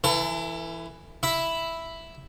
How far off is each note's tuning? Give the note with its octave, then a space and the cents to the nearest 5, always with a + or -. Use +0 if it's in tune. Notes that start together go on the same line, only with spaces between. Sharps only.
E3 +5 E4 +35 A4 +35
E4 +0 E5 +0